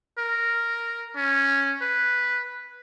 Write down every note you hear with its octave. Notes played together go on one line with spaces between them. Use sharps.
A#4
C#4
B4